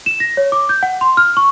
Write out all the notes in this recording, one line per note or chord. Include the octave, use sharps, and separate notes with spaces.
E7
A#6
C#5
D6
G6
F#5
C6
F6
C#6